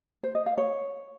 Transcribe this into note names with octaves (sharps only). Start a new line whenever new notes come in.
C5
D#5
F5
C#5